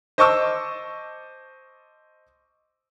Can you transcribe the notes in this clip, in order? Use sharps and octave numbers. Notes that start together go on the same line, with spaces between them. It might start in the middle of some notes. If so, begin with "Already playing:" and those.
C5 D#5 A5 C#6 D6 E6